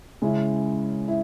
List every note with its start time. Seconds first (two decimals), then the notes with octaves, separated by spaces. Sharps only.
0.22 C#3 G#3 C#4 E4
1.08 E4